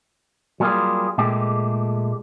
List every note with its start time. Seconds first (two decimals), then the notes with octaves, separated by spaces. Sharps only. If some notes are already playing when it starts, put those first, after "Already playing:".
0.60 F#3 G3 A#3 B3 F4 G#4
1.18 A#2 G#3 A3 G4